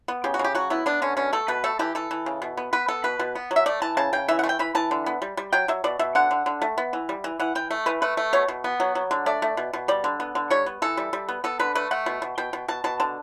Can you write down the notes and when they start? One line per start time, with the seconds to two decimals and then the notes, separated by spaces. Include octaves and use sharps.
0.08 B3
0.24 C#3 G4
0.34 F#4
0.39 C#3
0.44 G4
0.55 F#3 F#4
0.70 B3 E4
0.86 B3 D4
1.02 D3 C#4
1.17 B2 C#4
1.33 A3 A4
1.48 B2 B4
1.64 A3 A4
1.79 E3 G4
1.95 E3 A4
2.11 E3
2.26 C#3
2.42 B2
2.57 B3
2.73 B3 B4
2.88 B3 A4
3.04 B2 B4
3.19 B2
3.35 B3
3.51 F#3
3.56 E5
3.66 A3 D5
3.82 E3 A5
3.97 C#3 A5
4.13 C#3 G5
4.28 E3 E5
4.39 F#5
4.43 A3
4.49 G5
4.59 E3 B5
4.75 E3 A5
4.91 D3
5.06 B3
5.22 G3
5.37 G3
5.53 F#3 G5
5.68 F#3 E5
5.84 B2 D5
5.99 B2 E5
6.15 D3 F#5
6.31 D3
6.46 D3
6.62 A3
6.78 B3
6.93 E3
7.09 G3
7.24 E3
7.40 E3 F#5
7.55 E3 G5
7.71 A3
7.86 E3 B4
8.02 A3 B4
8.17 A3
8.33 B2 C#5
8.48 B2
8.64 B3
8.80 F#3
8.95 F#3
9.11 D3
9.26 A3 D5
9.42 A3
9.57 B2
9.73 B2
9.88 G3 D5
10.04 D3
10.20 B3
10.35 D3
10.50 G3 C#5
10.66 B3
10.82 E3 A4
10.97 G3
11.13 G3
11.29 B3
11.44 B3 A4
11.59 D3 B4
11.75 A3 B4
11.91 A3 F#5
12.06 B2
12.22 B2
12.38 B2 G5
12.53 B2
12.68 B2 A5
12.84 B2 A5
13.00 D3 A5